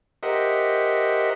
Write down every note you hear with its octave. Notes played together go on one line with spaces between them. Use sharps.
G4 A#4 C5 D#5 E5 F#5